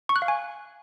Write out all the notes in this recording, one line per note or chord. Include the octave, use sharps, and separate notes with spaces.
C#6
F#6
F5
G#5